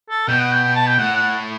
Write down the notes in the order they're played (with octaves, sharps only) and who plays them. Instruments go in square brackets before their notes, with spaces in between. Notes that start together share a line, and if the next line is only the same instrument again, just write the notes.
[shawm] A4
[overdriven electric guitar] B2 [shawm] G5
[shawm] F#5
G5
G5
A5
G5
[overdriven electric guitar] A2 [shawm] F#5
[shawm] F#5